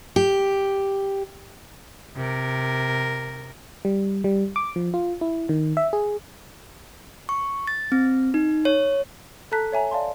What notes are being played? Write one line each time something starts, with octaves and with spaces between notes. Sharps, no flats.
G4
C3 A#4
G3
G3
D6
F3
F4
E4
D#3
E5
G#4
C#6
A6
C4
D#4
C#5
A4 A5 A#5 F#6 B6
C#5 E5 G#5 A#5
D5 F5 A5 C6